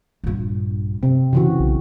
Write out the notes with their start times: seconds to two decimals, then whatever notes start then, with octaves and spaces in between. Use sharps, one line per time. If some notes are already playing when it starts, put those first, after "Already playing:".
0.24 A#1 G2
1.03 F#2 C3 C4
1.33 C#3 E3 F#4
1.60 B1